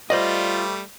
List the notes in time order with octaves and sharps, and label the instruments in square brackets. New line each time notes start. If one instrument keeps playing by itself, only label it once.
[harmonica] G3 A3 [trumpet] F4 [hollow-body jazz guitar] C5 D5 D#5